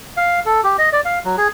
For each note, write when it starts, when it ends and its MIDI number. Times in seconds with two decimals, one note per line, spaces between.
0.17 0.40 77
0.46 0.61 69
0.64 0.76 67
0.78 0.89 75
0.93 1.01 74
1.05 1.19 77
1.25 1.36 54
1.38 1.48 68